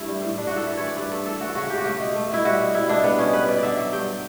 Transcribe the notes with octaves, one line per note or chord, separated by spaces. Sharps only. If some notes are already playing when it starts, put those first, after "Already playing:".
Already playing: G2 A3 E4
G3
A2
G3 D4
F#4
A2 A4
E3 B4
A3 C#5
D5
G2 B4
G2 A4
E3 A4
A3 F#4
C#3 F#4
C#3 G4
F#4
A3 G4
B2
A3
B2 E4
G3 F#4
B2
G3 E4
B2 D4
G3 B3
B2 C#4
G3 B4
B2 D5
D3 D5 E5
F#3
G2 G5